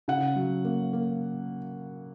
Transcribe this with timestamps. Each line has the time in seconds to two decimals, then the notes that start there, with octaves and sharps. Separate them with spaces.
0.08 C#3 F#5
0.36 F#3
0.65 A#3
0.93 A#3